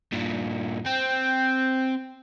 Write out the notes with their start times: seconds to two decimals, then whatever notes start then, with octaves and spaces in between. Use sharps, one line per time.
0.12 G2 A#2
0.86 C4 G5